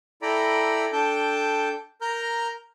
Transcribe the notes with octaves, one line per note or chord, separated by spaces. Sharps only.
E4 A4 D5 G5 A#5 B5
D4 A4 G5 A5 G6
A#4 A#5 F6 G6